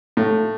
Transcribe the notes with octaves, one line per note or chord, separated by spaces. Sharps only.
A2